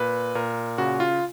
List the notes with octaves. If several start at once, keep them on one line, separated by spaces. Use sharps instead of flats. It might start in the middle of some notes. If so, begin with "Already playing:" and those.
Already playing: A#2 B4
A#2 A#4
C#3 F#4
F4